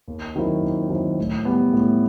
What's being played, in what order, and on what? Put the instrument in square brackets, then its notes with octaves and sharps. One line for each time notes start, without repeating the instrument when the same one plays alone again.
[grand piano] D#2
D#3 F#3 C4 E4
D#2
D#3 F#3 C4 E4
A2
G3 B3
A2